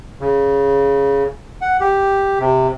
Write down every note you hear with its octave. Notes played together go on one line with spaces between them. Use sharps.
C#3
F#5
G4
C3